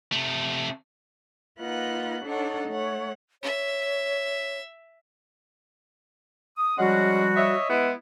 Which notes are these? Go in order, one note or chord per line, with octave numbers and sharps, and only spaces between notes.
C3 A3
A#3 D#4 F4 B4 F#5 F#6
D4 D#4 A4 C#5 F#5
A3 C#5 F#5
C#5 E5
D#6
F3 G3 G#3 C#4 F#4 F#5
C#5 D#5 E5
G#3 B3 E4